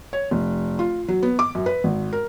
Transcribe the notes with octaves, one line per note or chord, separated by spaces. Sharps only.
C#5
F1
F4
F#3
B3
D6
F#2
B4
G#1
A#4